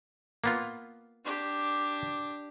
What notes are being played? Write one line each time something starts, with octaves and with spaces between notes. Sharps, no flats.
A#3 B3 F4
D4 G4